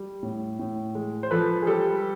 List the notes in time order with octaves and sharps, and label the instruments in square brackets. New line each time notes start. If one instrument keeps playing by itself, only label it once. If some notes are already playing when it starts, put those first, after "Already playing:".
Already playing: [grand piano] G3
A2
A2
G#3
C5
F3 A4 B4
G#4
G3 G4 A4